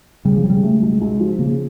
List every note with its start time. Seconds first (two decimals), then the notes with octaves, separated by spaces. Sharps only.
0.25 C#3 G3
0.37 F3
0.44 C#3
0.50 G3
0.63 A3
0.82 C#2
1.01 C#2
1.20 F3
1.39 C#3 A#3